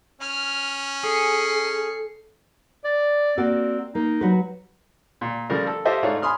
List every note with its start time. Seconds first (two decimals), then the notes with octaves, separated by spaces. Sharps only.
0.21 C#4 F6
1.03 G#4 A4 C7 C#7
2.84 D5
3.38 A#3 C4 F#4 D5
3.95 A#3 D#4
4.21 F#3 F#4 B4
5.21 A#2
5.50 C#3 F3 G3 A3 A#4
5.67 A4
5.85 F4 G4 A4 C5 D#5 E5
6.03 G#2 A3 D4 F4 C#5
6.22 G#5 B5 C6 D#6 F6